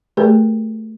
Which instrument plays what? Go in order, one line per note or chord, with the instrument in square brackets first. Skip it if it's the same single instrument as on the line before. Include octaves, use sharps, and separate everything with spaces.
[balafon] A3 G4 G#4 A#4 B4